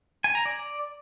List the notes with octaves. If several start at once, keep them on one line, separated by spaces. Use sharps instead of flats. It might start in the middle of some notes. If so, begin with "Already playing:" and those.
G#5
A#5
D5